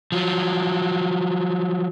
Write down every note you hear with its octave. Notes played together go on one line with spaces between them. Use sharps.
F3 F#3